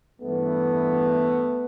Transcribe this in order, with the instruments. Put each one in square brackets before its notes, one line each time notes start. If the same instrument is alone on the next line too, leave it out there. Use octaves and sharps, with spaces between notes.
[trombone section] G2 E3 A3 B3